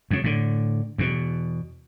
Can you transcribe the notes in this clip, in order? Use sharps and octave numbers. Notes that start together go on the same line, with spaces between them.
F2 C#3
A2 D3
E2 B2